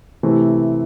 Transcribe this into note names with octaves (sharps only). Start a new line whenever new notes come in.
C3 E3 A3 C4